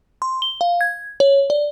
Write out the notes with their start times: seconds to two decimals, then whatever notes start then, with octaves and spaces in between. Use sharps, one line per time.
0.22 C6
0.42 G7
0.61 F5
0.81 G#6
1.20 C#5
1.50 D5